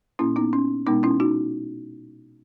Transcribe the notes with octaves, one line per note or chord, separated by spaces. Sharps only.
A#2 A#3 C#4 E4
B3 D#4
C#4
B2 G#3 B3 D#4
C#4 E4
D#4 F#4